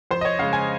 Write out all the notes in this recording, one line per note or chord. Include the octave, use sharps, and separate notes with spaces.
F2 C5
D#5
C#5
C#3 G#3 F5
G#5